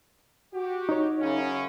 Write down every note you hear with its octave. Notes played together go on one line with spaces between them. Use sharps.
F#4 G4
D#4 C#5
F#2 C#3 C#4